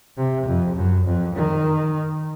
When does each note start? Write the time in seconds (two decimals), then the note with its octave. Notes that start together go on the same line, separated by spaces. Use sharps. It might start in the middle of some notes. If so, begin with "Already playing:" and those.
0.17 C3
0.47 F2
0.76 F#2
1.05 F2
1.35 D#3